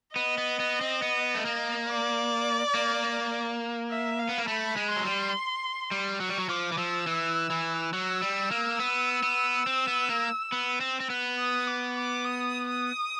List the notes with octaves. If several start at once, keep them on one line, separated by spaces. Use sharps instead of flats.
B3 D#5
B3
B3
C4
B3
A3
A#3
D5
A#3
E5
F5
B3
A#3
A3 B5
G#3
C6
F#3
G3
G3
F#3 C#6
G3
F#3
F3 D6
E3
F3 E6
E3
E3
F#3 E6
G3
A#3
B3
B3
C4
B3
A#3
B3
C4
C4
B3
D#6
D6
D6
D#6
D#6